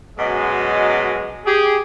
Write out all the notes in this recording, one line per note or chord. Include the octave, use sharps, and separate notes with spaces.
F#2 B2 G#3
G4 G#4